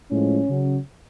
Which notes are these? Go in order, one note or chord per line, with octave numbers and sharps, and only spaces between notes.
A2 F3 G#3 C#4
C#3 F#3